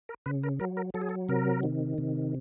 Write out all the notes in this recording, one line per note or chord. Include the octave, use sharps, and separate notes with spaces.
A#4
C#3 B4
A#4
F#3 A#4
A#4
F#3 A4
G#4
A4
C3 A#4
D#3
C3